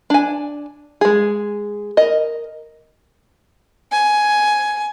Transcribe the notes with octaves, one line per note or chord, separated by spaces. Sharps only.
D4 G#5
G#3 G#4
A#4 D#5
G#5